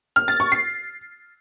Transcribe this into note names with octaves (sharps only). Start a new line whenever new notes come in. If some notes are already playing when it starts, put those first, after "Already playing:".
F6
A6
C#6
C7